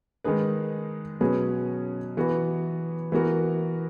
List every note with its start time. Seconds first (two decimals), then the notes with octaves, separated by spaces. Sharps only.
0.24 D#3 G#3 D#4 G#4 B4
1.20 B2 F#3 C#4 G#4 B4
2.17 E3 B3 F#4 B4
3.12 E3 B3 F#4 A#4